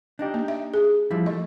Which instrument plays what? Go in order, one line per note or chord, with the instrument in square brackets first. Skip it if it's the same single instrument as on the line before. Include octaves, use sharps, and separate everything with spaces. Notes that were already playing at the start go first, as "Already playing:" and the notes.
[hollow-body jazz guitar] D4 D#4 G4
[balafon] A#3
E5
G#4
[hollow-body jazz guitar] F3 G3 E4
[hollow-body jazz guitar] A3 [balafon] D#5